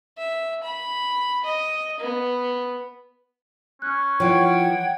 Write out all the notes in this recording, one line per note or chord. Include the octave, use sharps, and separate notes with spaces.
E5
B5
D#5
B3
C#4 F#6
E3 F3 C#5 F#5 G5 G#6